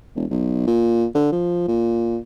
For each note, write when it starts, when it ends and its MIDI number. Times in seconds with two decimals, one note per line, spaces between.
0.15 0.25 28
0.30 0.64 35
0.67 1.05 46
1.15 1.32 50
1.32 1.66 53
1.68 2.18 46